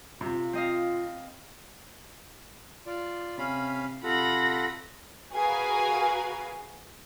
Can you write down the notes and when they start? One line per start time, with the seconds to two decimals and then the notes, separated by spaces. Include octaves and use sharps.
0.21 C3 F4
0.53 C4 D#5 F5
2.86 F4 D5
3.38 C3 C#4 F5 B5
4.03 C3 F4 A4 F#5 B5 A#6
5.31 F#4 G#4 A#4 B4 F5 G#5